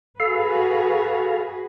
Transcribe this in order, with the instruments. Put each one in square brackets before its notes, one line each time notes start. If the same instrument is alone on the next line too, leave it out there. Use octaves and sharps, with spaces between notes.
[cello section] F#4 G#4 B4 [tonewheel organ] A4 F5